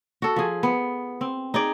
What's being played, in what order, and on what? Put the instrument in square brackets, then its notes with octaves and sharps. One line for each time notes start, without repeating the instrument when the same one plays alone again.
[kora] F#4 A4
F3 G#4
B3
C4
D#4 G#4 D5